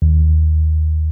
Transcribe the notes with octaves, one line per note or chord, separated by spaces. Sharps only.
D#2